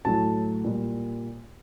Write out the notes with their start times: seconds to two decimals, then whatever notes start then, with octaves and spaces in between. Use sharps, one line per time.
0.05 A2 F#3 A3 A5
0.64 A#2 G3